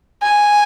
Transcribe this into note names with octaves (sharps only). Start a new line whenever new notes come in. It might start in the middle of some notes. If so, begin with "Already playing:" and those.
G#5